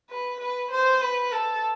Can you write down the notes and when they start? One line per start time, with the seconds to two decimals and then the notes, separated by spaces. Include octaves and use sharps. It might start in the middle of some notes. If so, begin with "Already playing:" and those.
0.10 B4
0.40 B4
0.71 C5
1.01 B4
1.32 A4